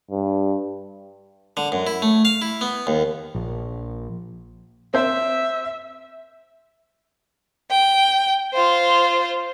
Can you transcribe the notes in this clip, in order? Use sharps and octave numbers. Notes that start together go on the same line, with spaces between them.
G2
D3
F#2
E4
A3
F5
E4
B3
D#2
A#1
C4 C5 E5
G5
F4 C5